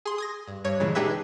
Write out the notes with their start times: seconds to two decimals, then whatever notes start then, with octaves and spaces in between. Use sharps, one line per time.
0.06 G#4 C6
0.18 D#6 G#6 A#6
0.48 G2
0.64 G2 C#5
0.80 A#2 C#3 E3 G#3
0.95 D4 D#4 G4 G#4 B4 E5